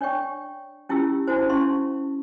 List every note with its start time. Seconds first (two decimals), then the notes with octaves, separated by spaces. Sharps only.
0.01 D4 C#5 D5 G5 C#6
0.89 C#4 E4 F4 G4 E6
1.28 D4 E4 F#4 C5
1.49 C#4 E4 F5 A5 C6 C#6